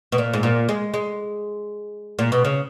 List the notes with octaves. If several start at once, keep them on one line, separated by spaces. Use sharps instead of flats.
B2
A#2
G#2
A#2
G#3
G#3
A#2
B2
C#3